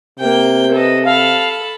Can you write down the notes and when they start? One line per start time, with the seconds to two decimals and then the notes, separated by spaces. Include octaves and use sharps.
0.19 C3 A#3 G5 G6
0.72 A4 B4 D#5
1.05 A4 F5 A5 B5